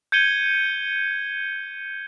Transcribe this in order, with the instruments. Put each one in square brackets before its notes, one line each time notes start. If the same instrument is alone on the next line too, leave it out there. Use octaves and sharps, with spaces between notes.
[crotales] G6 G#6 C#7 D#7 G7